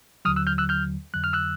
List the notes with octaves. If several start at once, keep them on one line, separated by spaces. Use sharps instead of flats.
D#2 D3 F#3 D#6 F6
E6 F#6
F6 G6
E6 F#6
F6 G6
F2 D3 F#3 F#6
F6
E6 F#6